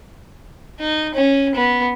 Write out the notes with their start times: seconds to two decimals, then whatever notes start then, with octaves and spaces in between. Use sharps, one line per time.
0.80 D#4
1.15 C#4
1.55 B3